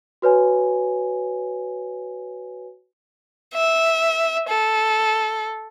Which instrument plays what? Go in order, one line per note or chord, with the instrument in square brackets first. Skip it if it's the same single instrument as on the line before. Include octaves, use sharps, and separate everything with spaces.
[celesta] F#4 B4 C#5 G#5
[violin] E5
A4